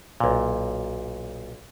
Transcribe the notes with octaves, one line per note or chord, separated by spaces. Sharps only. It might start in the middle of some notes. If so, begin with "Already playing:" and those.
B1 A#2